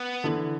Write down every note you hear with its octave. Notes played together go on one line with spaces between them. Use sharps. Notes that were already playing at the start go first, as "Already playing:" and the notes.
Already playing: B3
D3 E3